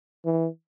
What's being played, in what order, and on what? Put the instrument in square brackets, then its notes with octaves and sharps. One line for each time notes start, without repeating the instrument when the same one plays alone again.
[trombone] E3